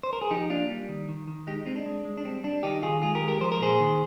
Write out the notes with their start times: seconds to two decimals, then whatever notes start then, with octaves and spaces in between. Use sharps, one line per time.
0.03 C5
0.13 A#4
0.21 G#4
0.30 F3 D#4 G4
0.50 A#3 D4 F4
0.70 G3
0.89 D#3
1.09 D#3
1.28 D#3
1.47 G#3 D#4 G4
1.66 G#3 C4 D#4
1.76 D4
1.86 G#3
2.05 G#3
2.17 D4
2.25 G3 C4
2.44 G3 D4
2.63 D#3 D#4 G4
2.82 D#3 F4 G#4
3.02 G#3 F4 G#4
3.15 G4 A#4
3.22 G#3
3.28 G4 A#4
3.41 F3 C5
3.52 A#4
3.60 A#2 G#4 C5
3.80 D#3